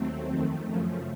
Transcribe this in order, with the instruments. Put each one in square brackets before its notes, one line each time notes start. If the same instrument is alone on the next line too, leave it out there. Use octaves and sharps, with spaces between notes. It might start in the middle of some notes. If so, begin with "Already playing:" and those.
Already playing: [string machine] D#2 F#3 A3 C4
F2 D#3 A3
F#2 C#3 F3 A3